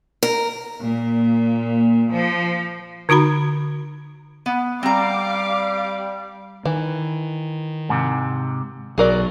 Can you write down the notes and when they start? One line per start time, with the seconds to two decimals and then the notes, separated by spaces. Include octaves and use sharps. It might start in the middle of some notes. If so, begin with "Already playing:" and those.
0.23 A#4
0.81 A#2
2.12 F3
3.09 D3 D#4 F#4 A#5 B5
4.46 B3
4.83 G3 C4 F5 A#5 D6
6.65 D#3 E3
7.89 G#2 C3
8.98 B1 F#3 G#4 A#4 D5